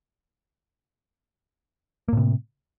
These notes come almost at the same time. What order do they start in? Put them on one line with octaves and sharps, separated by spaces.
A#3 A2 C3